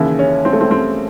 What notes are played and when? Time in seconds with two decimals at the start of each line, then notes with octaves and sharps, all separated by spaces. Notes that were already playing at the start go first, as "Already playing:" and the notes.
Already playing: D#2 C#3 E3 E4
0.19 C#4
0.45 C4
0.53 A3
0.61 C4
0.71 C4